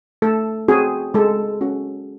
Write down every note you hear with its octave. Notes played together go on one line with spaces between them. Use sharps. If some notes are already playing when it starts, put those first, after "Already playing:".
A3 A4
C4 F#4 G#4
G#3 A4
C#4 F#4